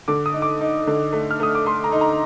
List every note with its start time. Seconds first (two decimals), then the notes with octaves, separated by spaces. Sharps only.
0.08 D3 D6
0.26 D#6
0.33 D#4
0.42 D6
0.61 D#4
0.87 D3
1.13 A3
1.31 F6
1.40 A3 D#6
1.55 D6
1.66 A3 C6
1.84 A#5
1.92 D#4
2.01 A#5